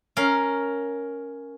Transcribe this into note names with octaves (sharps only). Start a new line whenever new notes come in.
C#4 A#4 F5